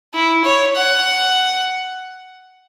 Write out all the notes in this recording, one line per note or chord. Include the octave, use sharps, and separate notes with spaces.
E4
C#5
F#5